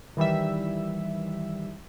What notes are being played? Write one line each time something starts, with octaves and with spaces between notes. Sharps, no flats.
D#3 E3 G3 E5